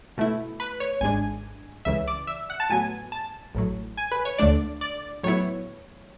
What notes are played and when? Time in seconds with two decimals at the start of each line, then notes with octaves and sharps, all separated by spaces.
0.18 B2 A3 E4
0.60 B4
0.80 C#5
1.01 G#1 G#2 G#3 D4 G#5
1.85 C#2 C#3 E3 E5
2.08 D5
2.27 E5
2.50 F#5
2.60 A5
2.70 A2 F#3 B3 G#5
3.12 A5
3.55 A1 A2 F#3
3.97 G#5
4.12 B4
4.25 C#5
4.38 D2 D3 A3 D4 D5
4.81 D5
5.23 A2 F#3 B3 E4 C#5